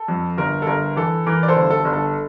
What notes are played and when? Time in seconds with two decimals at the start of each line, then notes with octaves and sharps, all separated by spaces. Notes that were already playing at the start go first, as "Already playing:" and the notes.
Already playing: A4
0.08 F2
0.38 G1 A#4
0.62 A4
0.67 G1 A#4
0.96 E3 A4
1.26 E3 A#4
1.43 D5
1.48 A4 C5
1.56 G1
1.70 A4
1.85 G1
1.93 A4